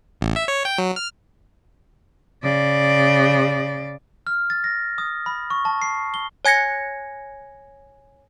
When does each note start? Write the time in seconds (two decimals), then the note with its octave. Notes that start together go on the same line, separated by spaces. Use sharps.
0.21 A1
0.36 E5
0.48 C#5
0.65 G5
0.78 F#3
0.96 F6
2.43 C#3 D5
4.27 F6
4.50 A6
4.64 A#6
4.98 D#6
5.26 B5
5.50 C#6
5.65 A5
5.82 C7
6.14 G7
6.45 C#5 G#5 G#6 A#6 C#7